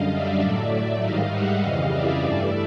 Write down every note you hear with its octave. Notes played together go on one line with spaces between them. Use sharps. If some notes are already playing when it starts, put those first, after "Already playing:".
Already playing: F#2 D3 G3 D#5 F5
D5 E5
A2 F#3 A3
G#2 D#3 G3 D#5 F5
E5 F#5
F2 C#3 E3 G3 D#5 F5
D5 E5
G2 E3 A3